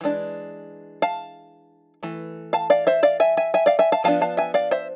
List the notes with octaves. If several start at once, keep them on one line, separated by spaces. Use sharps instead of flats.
E3 G#3 D4
F5 A5
E3 A3
F5 A5
D5 F5
C5 E5
D5 F5
E5 G#5
E5 G#5
E5 G#5
D5 F5
E5 G#5
F5 A5
F3 B3 D4 F5 A5
F5 A5
E5 G#5
D5 F5
C5 E5